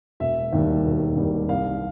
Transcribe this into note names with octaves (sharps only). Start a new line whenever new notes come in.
E1 E5
D#2 D#3 G3
E1
D#2 D#3 G3
C2 F5